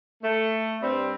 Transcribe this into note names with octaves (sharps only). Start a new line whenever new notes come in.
A3
G2 G3 C4